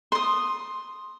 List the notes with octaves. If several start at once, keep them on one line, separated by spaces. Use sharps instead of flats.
C6 D#6